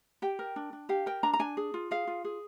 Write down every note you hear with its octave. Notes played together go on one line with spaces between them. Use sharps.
G4 G5
A#4
D4
D4
G4 F5
A#4 G5
D4 A#5
A#5
D4 G#5
G#4
F4
G#4 F5
F4
G#4